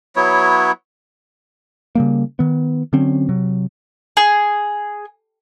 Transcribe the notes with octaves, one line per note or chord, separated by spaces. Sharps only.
F#3 B3 E4 C#5
C#3 G3 A#3
D#3 B3
D3 F#3 C4 C#4
C3 F#3
G#4